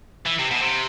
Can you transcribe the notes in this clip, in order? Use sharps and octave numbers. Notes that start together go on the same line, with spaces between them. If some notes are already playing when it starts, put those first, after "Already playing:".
E3
C3
B2
C3